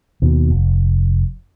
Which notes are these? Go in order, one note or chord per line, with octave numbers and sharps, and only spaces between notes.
D#2 B2
F1